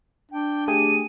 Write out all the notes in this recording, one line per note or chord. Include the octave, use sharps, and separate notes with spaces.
D4 G5
A3 G4 G#4 D#7